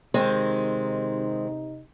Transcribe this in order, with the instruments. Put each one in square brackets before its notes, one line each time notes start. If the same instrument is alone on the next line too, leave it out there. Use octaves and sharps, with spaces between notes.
[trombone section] C3 D#4 [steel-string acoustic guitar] D#3 G#3 C4